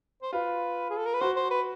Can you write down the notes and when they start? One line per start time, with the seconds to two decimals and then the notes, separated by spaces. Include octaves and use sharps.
0.23 C5
0.33 F4 B4
0.90 G#4
0.97 A4
1.06 A#4
1.14 B4
1.21 F#4 C5
1.36 C5
1.51 B4